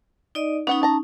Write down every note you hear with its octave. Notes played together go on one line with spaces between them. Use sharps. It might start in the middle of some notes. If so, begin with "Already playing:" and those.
D#4 D5 D#5
B3 C#4 D#4 F#5
A5 A#5